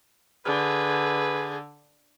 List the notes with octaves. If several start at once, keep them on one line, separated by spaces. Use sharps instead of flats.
D3 G#4 B4